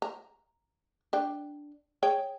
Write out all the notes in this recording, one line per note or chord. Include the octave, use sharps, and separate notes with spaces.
A#5
D4 D5 G5
G#4 C#5 G5